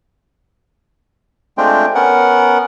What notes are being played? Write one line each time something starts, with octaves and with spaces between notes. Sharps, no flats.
G#3 A3 C4 D4 F4 G5
B3 C#4 A#4 F#5